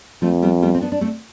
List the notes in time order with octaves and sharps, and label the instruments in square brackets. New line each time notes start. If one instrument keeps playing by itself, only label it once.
[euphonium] F2 [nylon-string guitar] F3 A3
[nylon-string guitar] G3 B3
G3 B3
C4
B3 D4
D4
A3 C4